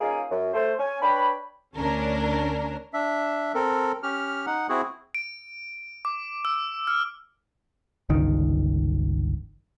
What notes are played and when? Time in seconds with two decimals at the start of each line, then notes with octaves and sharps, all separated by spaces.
0.01 A#3 C#4 D#4 F4 G#4
0.31 F#2
0.53 A3 C5
0.79 C#4 G#5
1.02 D4 B4 C#5 G5 B5
1.76 D2 C#4 D4 A#4
2.93 D4 E5
3.54 C4 A4 A#4
4.03 C#4 G4 F6
4.46 D#4 F#5
4.69 C4 E4 F#4 G#4
5.15 D7
6.05 D6
6.45 E6
6.87 F6
8.09 G1 C#2 D#3